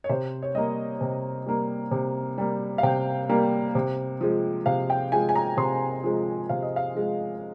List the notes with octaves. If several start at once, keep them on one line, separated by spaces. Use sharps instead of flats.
C#5
C3 C5
C#5
G3 A#3 D#5
C3
G3 A#3
C3
G3 A#3
F5
C3 G5
G3 A#3
C3
F3 G#3
C3 F5
G5
F3 G#3 G#5
G#5
A#5
C3 C6
F3 G#3
C3 F5
D#5
F5
F3 G#3